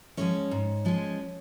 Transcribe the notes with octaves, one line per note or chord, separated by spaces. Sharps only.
F3 G#3 C#4 C#5
G#2
F3 G#3 C#4